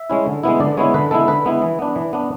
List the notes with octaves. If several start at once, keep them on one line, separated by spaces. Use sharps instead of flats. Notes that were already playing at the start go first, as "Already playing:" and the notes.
Already playing: E5
G#3 C#4 E4
D3
G#3 B3 E4
D3 D5
G#3 B3 E4 C#5
D3 B4
G#3 B3 E4 A4
D3 B4
G#3 B3 E4
E3
B3 D4
E3
B3 D4